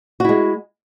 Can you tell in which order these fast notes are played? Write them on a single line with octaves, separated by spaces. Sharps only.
F#4 E4 G#3